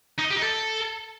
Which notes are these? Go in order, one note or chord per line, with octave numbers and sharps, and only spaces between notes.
D#4
D#5
G4
D#4
A4